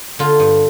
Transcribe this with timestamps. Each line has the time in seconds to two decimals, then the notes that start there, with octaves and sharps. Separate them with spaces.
0.19 D3 F4
0.40 G2